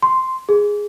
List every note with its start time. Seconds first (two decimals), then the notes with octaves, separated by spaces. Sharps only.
0.03 C6
0.49 G#4